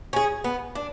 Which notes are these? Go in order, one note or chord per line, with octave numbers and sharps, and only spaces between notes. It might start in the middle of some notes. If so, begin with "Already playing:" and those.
C#4 G#4
B3
D4